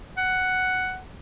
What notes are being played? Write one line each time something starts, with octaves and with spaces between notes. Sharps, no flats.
F#5